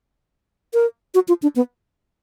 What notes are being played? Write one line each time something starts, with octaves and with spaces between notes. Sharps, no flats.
A#4
F#4
F4
D4
B3